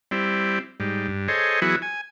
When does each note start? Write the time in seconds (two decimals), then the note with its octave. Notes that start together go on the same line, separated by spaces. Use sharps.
0.11 G3 C4 E4
0.80 G#2 G3
1.08 G2
1.28 G#4 A4 C5 C#5 D#5
1.62 E3 F#3 B3 E4 F#4 G#4
1.82 G#5